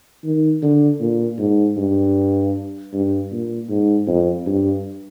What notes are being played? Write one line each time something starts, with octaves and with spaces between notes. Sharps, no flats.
D#3
D3
A#2
G#2
G2
G2
A#2
G#2
F2
G2